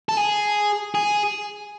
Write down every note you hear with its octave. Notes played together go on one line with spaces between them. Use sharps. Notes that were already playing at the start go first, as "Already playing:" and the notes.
A4
G#4
G#4